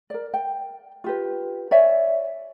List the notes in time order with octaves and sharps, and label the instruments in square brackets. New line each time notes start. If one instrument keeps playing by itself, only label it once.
[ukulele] A#4 D5
G5
F4 G4 B4
C#5 D5 E5 G#5